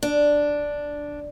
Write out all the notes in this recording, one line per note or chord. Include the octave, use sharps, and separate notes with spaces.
D4